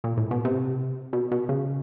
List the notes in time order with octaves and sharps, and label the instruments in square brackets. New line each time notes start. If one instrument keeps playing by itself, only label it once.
[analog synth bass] A#2
A2
B2
C3
B2
B2
C#3